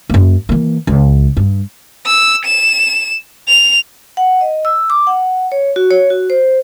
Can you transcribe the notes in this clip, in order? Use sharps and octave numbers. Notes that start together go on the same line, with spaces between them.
F#2 A#3
E3 A#3
C#2
G2
E6
E7
F7
F#5
D#5
E6
D6
F#5
C#5
F#4
C#5
F#4
C5